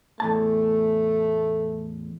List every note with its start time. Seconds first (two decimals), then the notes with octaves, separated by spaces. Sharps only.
0.20 E2 A2 A3 A5